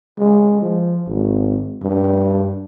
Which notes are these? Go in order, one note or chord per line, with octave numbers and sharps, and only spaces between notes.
G#3
F3
G#1
G2